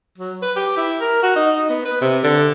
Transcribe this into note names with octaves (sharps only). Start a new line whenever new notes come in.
F#3
B4
G4
E4
A#4
F#4
D#4
D#4
B3
B4
C3
D3